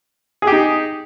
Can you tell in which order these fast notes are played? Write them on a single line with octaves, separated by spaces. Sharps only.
G#4 G4 D#4